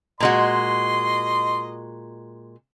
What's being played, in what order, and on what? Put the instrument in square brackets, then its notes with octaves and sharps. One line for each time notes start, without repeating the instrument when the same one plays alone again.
[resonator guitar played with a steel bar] A#2 G#3 F#4 [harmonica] D#5 C6